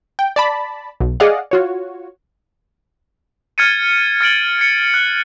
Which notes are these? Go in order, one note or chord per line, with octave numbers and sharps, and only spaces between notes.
G5
D5 A5 B5
B1
G#4 D5 D#5 F5 F#5
F4 F#4 C#5
F6 G#6 A6 C#7 D#7
F6 A6 D7 F#7
G#6 C#7
F#6